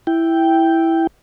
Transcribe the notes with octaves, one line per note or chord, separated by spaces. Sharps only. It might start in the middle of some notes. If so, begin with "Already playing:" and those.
E4 G5